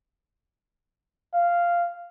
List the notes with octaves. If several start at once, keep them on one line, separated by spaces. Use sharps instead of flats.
F5